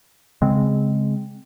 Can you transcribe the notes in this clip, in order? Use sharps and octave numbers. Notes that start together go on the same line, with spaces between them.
C#3 G#3 C4